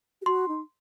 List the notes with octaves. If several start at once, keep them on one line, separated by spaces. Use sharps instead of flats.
G4
F#4 C6
D#4